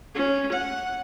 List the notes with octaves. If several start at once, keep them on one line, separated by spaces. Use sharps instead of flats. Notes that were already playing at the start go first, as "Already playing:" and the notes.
C#4
F#5